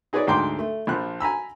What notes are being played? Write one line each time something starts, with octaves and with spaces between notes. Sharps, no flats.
D#4 G#4 B4 C#5 D5
D2 G#2 G5 C6 D6
A3
A#1 F3 F#6
G#5 A#5 B5 E6